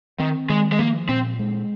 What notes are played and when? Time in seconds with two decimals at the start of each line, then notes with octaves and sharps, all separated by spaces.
0.19 D#3 C4
0.50 D#3 G#3
0.72 G#3
0.79 F3 A#3
1.09 A#2 C4
1.39 G#3